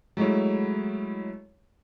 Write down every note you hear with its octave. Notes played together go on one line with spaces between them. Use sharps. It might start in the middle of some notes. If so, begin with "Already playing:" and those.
F#3 G#3 A3 E4 C#5